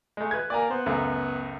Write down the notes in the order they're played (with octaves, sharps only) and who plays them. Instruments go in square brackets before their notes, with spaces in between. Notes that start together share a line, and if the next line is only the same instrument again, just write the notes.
[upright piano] G#3 A3
B4 G#6
[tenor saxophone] A#3 [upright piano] D5 G#5 A#5
[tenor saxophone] B3 [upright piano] C5
[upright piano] C#2 F#2 A3